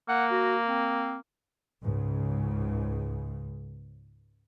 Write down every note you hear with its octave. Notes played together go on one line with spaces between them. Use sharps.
A#3 F#5
F#4
C4
C#2 G#2 C#3